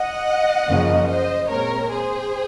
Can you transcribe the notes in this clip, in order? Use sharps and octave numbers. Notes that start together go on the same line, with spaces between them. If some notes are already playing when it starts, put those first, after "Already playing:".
Already playing: D#5 F#5
F#2 C#3 F3 A#3 C#4
C5 D#5
A#2 G#3 C4 A#4 C#5
G#4 C5